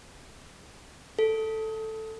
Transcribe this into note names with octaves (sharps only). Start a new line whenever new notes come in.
A4